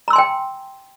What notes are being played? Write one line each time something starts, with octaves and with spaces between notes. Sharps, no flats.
G5 G#5 A#5 C6 E6